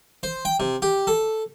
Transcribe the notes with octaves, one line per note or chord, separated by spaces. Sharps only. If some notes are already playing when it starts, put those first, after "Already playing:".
C5
G5
C3
G4
A4